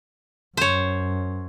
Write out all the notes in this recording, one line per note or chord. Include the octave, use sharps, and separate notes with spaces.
F#2 C5 C#5